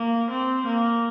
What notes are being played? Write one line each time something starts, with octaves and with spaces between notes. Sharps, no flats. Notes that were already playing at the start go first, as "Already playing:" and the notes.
Already playing: A#3
C4
A#3